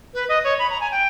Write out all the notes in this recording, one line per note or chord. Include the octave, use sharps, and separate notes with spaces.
B4
D#5
C#5
B5
A#5
G#5
G5